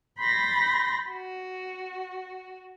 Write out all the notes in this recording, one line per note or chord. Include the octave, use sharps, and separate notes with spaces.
B5 C6 G6 A6 A#6
F#4